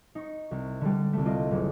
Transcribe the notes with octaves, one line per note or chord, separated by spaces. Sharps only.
D#4 C#6
C2
D3 G3
C2 A3
F4 D5 D#5
F#1